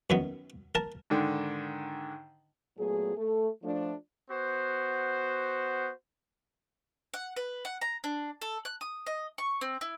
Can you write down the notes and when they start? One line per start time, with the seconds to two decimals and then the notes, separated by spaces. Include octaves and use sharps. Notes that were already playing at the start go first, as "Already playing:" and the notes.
0.10 F#2 D#3 B3
0.75 A#4 A5
1.10 G#2 D3 D#3
2.78 A#2 F#3 A3 B3 G#4
3.16 A3
3.63 F3 A3 D4
4.30 B3 F#4 C5
7.14 F#5
7.36 B4
7.65 F#5
7.81 A#5
8.04 D4
8.42 A4
8.65 F#6
8.81 D#6
9.06 D#5
9.38 C#6
9.61 C4
9.81 E4